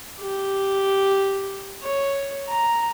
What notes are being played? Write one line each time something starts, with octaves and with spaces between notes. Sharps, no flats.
G4
C#5
A#5